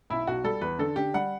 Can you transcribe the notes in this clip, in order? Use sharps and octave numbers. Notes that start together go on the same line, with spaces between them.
B1 E4
B1 F#4
G3 A4
E2 B4
D3 A4
D3 G4
G3 F#5